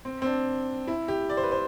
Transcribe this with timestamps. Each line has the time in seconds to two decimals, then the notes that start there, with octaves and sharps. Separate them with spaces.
0.05 C4
0.22 C4
0.26 D4
0.87 E4
1.08 G4
1.30 D5
1.37 C5
1.43 B4
1.52 C5